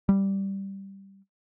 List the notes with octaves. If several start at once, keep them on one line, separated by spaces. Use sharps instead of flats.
G3